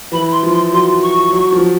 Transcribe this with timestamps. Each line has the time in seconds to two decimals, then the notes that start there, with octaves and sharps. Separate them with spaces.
0.12 E3 B5
0.32 C6
0.43 F3
0.53 C6
0.72 F#3 C6
1.02 C#6
1.32 F#3
1.52 F3